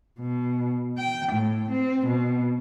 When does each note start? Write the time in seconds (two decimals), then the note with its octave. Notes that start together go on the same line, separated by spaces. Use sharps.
0.20 B2
0.98 G5
1.32 A2
1.71 C4
2.07 B2